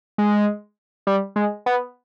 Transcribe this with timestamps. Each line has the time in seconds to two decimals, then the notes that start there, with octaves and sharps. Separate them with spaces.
0.18 G#3
1.07 G3
1.36 G#3
1.66 B3